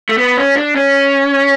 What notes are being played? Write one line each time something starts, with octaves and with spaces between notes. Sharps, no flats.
A3
B3
C#4
D4
C#4